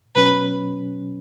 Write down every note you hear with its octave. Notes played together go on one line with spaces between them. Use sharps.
B2 F#3 C#4 B4